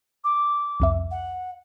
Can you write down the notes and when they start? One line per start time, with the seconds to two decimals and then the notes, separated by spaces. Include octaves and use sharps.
0.24 D6
0.80 C2 F2 E5
1.11 F#5